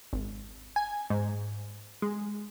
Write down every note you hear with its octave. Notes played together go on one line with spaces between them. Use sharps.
G#1
G#5
G#2
G#3